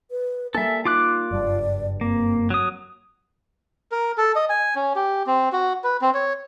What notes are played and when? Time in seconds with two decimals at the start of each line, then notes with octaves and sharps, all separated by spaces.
0.11 B4
0.55 G3 A#3 A4 E5 G#5
0.85 D#4 F4 D6 F#6
1.31 F#1 G2 D5
2.01 A#3 C4
2.50 F#3 D#6
3.92 A#4
4.18 A4
4.36 D#5
4.49 G#5
4.75 C#4
4.96 G4
5.27 C4
5.52 F#4
5.84 B4
6.01 C4
6.14 C#5